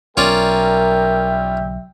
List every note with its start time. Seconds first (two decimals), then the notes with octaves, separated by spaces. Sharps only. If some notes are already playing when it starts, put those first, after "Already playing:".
0.17 B1 G3 C#4 F4 A#4 D5 E5 G5